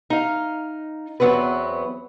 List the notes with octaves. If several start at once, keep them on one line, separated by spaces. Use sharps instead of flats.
D#4 F5
E2 F#3 B3 C4 B4